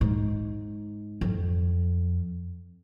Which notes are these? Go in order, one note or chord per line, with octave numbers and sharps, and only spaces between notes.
G#2
F2